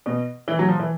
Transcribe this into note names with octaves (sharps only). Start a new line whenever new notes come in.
B2
E3
F#3
F3
E3